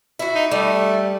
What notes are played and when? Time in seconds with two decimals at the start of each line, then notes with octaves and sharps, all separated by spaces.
0.19 E4 F#4
0.35 D#4
0.51 G3 A3